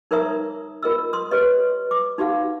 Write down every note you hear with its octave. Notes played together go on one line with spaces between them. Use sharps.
D#4 A#4 C#5 E5 A#5 D#6
F4 A#4 D#5 E6
C6 D#6
G4 B4 C#5 D#5
D6
D#4 F#4 G4 F5 F#5